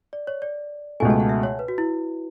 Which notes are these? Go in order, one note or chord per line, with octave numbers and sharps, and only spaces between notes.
D5
C#5
D5
C#2 B2 A3 G#5
A5
F#5
E5
C#5
B4
F#4
E4